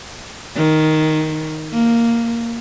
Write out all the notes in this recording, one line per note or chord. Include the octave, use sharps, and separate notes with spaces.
D#3
A#3